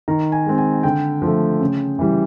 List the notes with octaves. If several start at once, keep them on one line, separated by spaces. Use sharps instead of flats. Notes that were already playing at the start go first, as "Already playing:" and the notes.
D#3 A#5
G#5
G#3 C4
G#5
D3 G5
F3
A3
C#3
E3 G3